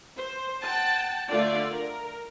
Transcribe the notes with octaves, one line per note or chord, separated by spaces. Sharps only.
C5
F#5 G5 A5
D3 A3 F4 D5
A#4